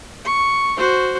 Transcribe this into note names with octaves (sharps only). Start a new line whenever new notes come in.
C#6
F#4 C5